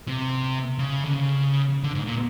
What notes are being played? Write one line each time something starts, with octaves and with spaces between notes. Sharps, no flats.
C3
C#3
D3
C#3
D3
G#2
A#2